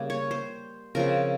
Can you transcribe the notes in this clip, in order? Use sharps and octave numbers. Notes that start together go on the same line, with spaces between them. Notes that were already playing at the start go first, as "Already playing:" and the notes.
Already playing: C#3 G3 A#3 C#4
C#5
C5
C#3 F3 C4 A#4